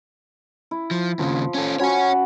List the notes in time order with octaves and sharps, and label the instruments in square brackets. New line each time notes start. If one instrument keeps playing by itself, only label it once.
[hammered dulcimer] E4
[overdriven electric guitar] F3
[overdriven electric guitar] D#2 C#3 [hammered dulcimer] F3
[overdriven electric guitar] C#4 A4
[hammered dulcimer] C#4 F#4 B5 [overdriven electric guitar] C#5 G#5